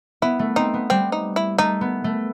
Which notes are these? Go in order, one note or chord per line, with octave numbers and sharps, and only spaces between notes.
B3 E4
A3
C4 D#4
B3
G3 C4
D#4
E4
A3 D#4
B3
A3